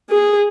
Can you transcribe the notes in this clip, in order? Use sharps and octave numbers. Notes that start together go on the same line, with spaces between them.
G#4